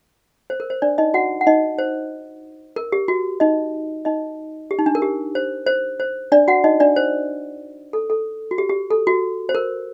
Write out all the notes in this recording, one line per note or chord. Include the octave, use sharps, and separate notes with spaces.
C5
A#4
C5
D4 D5
D#4 D#5
F#4 F#5
F#5
D#4 D#5
C5
A#4
G4
F#4
D#4 D#5
D#4 D#5
G4
D#4
D4
A#4
G4
C5
C5
C5
D4 D5
F#4 F#5
D#4 D#5
D4 D5
C5
A4
A4
F#4
G4
G4
A4
F#4
C5
A#4